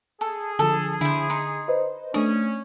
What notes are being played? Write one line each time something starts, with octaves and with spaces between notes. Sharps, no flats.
G#4 A4
D3 F3 A4
D3 E4 C5
D#4 C6
B4 C5 D#5
A3 C#4 D4 D#6